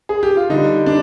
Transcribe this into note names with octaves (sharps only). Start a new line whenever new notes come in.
G#4
G4
F4
D3 G3 D#4
D4